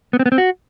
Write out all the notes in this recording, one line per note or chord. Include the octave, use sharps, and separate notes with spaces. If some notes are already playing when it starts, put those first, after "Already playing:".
B3
C4
B3
C4
F#4